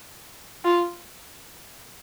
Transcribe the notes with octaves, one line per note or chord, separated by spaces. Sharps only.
F4